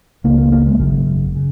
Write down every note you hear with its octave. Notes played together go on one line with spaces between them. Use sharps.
C#2 C#3 A#3
A#3
A#3
G#3
G#1 F#2 C#3
C#3